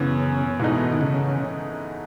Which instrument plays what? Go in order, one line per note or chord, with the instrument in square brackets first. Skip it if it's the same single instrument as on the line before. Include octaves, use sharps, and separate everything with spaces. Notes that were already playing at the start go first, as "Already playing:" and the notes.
Already playing: [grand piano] F#2 E3 B3 [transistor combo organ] C#3
[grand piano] G#2 E3 A3 D#4 [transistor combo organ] B2
[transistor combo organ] D#3
C#3